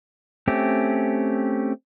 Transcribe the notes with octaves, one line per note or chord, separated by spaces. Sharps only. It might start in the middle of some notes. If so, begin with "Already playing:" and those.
A3 C4 C#4 G4